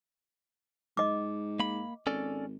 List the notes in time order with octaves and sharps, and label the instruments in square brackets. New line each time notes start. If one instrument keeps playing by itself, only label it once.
[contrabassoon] G#2 [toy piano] D#5 D6
[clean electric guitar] A#3 B5
[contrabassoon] G#1 [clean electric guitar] C#4 A4 D5